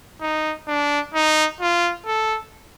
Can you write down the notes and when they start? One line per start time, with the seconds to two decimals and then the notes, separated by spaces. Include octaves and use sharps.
0.21 D#4
0.68 D4
1.14 D#4
1.61 F4
2.06 A4